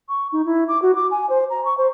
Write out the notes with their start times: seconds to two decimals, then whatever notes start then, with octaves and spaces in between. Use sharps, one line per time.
0.09 C#6
0.32 D#4
0.45 E4
0.68 D6
0.82 F#4
0.95 D6
1.11 G#5
1.29 C5
1.50 A#5
1.65 C#6
1.78 C5